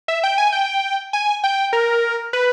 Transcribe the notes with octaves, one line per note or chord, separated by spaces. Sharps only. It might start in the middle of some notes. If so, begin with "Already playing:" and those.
E5
G5
G#5
G5
G#5
G5
A#4
B4